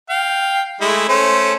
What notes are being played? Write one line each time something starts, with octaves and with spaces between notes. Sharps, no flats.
F5 G5
G#3 A3 E4
A3 C#4 C5